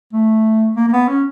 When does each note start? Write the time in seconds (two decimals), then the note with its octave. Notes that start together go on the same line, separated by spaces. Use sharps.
0.13 A3
0.76 A#3
0.88 A#3
0.93 B3
1.08 C#4